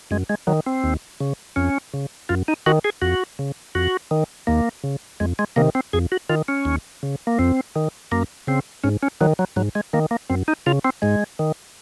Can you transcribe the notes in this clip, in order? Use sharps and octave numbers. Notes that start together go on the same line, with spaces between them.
F#2 G#3
G#3
D#3 F#3
C4
D#2
C#3
F2 C#4
C#3
F#2 F4
D#4
D#3 F#4
G#4
F2 F#4
C#3
F2 F#4
D#3
D#2 A#3
C#3
F2 G#3
G#3
C3 D#3 A#3
C4
F2 G#4
F#4
D#3 F4
C#4
D#2
C#3
A#3
F2 C4
D#3
F#2 A#3
C#3 C4
G#2 C#4
C#4
D#3 F#3
F#3
G#2 F#3
G#3
D#3 A#3
A#3
F#2 C4
D#4
C#3 F4
C4
G#2 G#3
D#3